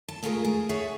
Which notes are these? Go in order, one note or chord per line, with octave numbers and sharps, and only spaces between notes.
A5
G#3 A3 F4 G#4 A#4
G#4
G#4 A4 C#5 E5 F#5